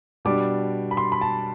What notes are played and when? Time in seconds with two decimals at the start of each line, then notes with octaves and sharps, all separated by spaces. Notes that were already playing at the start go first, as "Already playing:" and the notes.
0.25 B2 G3 D4 D6
0.91 B5
0.97 C6
1.12 B5
1.21 A5